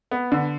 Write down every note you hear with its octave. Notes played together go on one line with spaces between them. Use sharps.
B3
D3